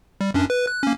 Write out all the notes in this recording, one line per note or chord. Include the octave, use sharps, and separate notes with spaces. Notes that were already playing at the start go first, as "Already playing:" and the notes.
G3
F#2 C#4 D4
B4
F#6
A#3 C#4